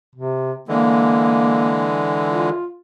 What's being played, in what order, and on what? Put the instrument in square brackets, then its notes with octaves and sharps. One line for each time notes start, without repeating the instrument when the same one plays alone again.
[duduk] C3
[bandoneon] D3 E3 G#3 [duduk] A#3
[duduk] F4